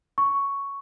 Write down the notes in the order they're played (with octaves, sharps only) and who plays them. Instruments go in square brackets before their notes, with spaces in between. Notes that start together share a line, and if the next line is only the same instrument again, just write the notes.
[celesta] C#6